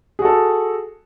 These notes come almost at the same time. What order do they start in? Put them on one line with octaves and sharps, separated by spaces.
G#4 F#4 A4